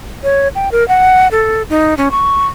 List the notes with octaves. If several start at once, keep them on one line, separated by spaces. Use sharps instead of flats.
C#5
G5
A#4
F#5
A4
D#4
C#4
C#6